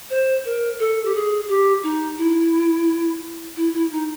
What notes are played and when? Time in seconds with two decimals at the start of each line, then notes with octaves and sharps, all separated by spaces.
0.10 C5
0.45 A#4
0.80 A4
1.05 G4
1.15 G#4
1.49 G4
1.83 D#4
2.18 E4
3.56 E4
3.74 E4
3.91 D#4